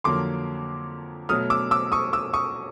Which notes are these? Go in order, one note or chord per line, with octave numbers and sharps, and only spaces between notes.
F2 D3 F#3 A#3 C6 D6
B2 F#3 A3 D#6 F6
D6 E6
D6 E6
C#6 D#6
D6 E6
C#6 D#6